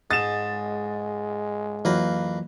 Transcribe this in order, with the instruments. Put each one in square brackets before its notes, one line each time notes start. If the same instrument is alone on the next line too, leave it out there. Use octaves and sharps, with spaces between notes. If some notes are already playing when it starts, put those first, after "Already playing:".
[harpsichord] G#2 [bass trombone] G#3 [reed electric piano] D#6 [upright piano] A6 E7
[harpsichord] F2 A#3 B4 [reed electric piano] E3 F#3